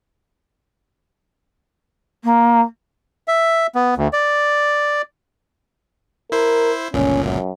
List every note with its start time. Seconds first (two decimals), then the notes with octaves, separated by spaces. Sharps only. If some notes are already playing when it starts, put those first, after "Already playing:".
2.23 A#3
3.28 E5
3.75 B3
3.97 D2
4.13 D5
6.32 E4 A#4 C5
6.94 G1 C#2 A#2 C#4
7.24 F#2